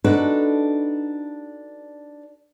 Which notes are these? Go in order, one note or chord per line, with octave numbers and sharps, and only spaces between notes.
D4 D#4 F#4 A4 B4